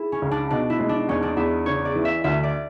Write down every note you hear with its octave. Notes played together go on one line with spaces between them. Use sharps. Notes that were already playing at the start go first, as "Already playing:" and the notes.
Already playing: E4 G#4
C#4
C#2
D4
B2 D4
E4
G#3
D4
E2 C#4
D4
E2 E4
C#3 C#5
D5
E3
E5
D2 E5
D5